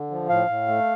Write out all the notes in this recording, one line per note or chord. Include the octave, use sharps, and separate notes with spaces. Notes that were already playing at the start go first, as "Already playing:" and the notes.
Already playing: D3
F3
A2 F5
A2
A3